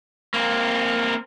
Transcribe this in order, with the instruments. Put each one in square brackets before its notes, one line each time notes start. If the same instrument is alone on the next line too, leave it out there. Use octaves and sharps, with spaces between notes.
[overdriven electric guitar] A#3 C4